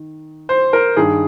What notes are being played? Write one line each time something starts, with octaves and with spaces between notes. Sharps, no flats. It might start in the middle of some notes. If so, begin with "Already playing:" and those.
Already playing: D#3
C5
A#4
G2 D#3 G#4